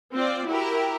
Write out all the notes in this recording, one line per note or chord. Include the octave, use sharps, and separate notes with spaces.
C4 F4 D5
E4 F#4 G4 A#4